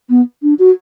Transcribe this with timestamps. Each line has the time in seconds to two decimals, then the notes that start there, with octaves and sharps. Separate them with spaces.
0.10 B3
0.43 D4
0.59 F#4